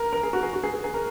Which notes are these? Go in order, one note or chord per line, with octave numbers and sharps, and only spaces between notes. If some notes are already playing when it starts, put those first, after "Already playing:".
Already playing: A#4
A#4
G#4
F#4
G#4
F#4
G#4
G#4
G#4
A#4